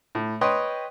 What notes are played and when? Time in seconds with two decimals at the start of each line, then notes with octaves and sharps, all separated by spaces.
0.15 A2
0.41 B4 C#5 D#5 G5 C6